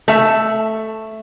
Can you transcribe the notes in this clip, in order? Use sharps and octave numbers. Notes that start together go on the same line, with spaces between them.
A3 E5